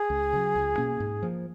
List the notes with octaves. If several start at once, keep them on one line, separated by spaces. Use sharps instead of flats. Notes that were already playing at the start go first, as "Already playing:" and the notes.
Already playing: G#4
C#2
C#3 F#3
C#2
B2 A#3 C#4
G#2
F3 A#3